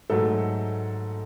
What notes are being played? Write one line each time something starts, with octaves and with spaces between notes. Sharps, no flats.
G#2 F#3 A3 A4